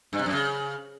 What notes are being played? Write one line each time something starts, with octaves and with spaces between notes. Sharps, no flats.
G2
C3
F#2
C#3